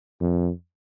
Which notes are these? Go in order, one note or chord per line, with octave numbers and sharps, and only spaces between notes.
F2